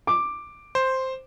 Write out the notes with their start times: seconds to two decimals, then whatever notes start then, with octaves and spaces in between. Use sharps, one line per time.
0.07 D6
0.75 C5